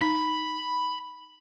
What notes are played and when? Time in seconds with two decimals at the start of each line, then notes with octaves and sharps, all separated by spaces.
0.01 D#4 B5